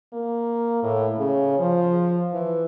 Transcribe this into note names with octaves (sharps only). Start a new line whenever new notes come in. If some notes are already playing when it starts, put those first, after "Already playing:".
A#3
A2
C#3
F3
E3